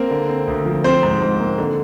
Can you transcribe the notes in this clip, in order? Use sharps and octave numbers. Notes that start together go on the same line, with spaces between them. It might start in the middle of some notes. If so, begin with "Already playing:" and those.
Already playing: A#3 C4 A#4
D3
C4
D2
F3
F3 C4 C5
G#2
G#2
A#3
D3